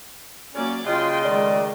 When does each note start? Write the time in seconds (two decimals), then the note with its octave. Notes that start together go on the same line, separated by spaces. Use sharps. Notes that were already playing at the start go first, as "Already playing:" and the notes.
0.54 F#3 A#3 C#4 D5
0.87 C#3 F4 D#5 G5 C6
1.25 D#3 G#3 A3 D5